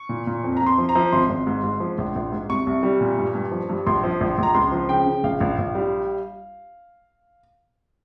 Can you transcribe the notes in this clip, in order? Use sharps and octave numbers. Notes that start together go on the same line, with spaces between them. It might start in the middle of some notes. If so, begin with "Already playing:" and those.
Already playing: C#6
A#2
A#2
F2
F2 A#5
C6
F3
A#5
F3
G#1 C6
G#1
G#2
G#2
F3
A#1
A#1
G#2
C2 C#6
C2
G3
A#2
G2
G2
F3
G2
A#1 C6
F3
A#1
A#1 A#5
C#2 C6
F3
C#3 G5
C#3
A#1 F5
A#1
A#1
G3